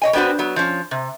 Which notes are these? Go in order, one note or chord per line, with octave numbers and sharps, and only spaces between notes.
C#5 D#5 G#5
B3 C4 D4 F#4 B4
F#3 B3
F3 C#4
C3